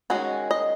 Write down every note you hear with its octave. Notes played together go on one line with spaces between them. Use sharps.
D#3 G#3 C#4 F#4
D#5